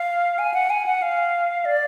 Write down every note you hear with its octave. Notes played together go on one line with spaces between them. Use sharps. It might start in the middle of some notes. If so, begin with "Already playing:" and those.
Already playing: F5
G#5
F#5
G#5
F#5
F5
D5